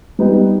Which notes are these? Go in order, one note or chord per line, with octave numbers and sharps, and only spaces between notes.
G3 B3 D#4 G4 B4